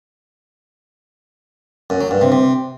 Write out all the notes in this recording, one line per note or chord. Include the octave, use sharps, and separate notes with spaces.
F#2
F#3
G2
C3
C3